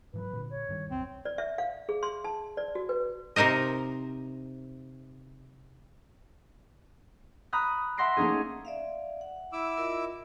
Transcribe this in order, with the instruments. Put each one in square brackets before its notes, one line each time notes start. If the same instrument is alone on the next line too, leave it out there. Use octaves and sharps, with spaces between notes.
[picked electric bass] G#2 E3 F#3 [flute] B4
[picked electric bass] A#2 D3
[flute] C#5
[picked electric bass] G2 D#3 G3
[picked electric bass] B1 F2 [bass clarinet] C4
[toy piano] D5
E5
F5
G#4
C6
A5
D5
F#4
B4
[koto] C3 D#4 A#4 C5 D#5
[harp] A#5 B5 D#6 F#6
E5 F#5 C6 A#6 C7 D7
A3 A#3 C#4 D#4 G#4
[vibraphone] D5 E5 F5
F#5
[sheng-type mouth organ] E4 D6 E6
[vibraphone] F4 A#4 D#5